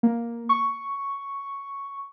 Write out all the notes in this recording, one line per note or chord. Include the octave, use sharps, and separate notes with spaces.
A#3
C#6